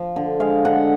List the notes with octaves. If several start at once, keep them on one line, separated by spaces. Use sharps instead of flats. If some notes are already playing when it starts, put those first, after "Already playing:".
Already playing: F3
D3
G#3 F5
D3 F#5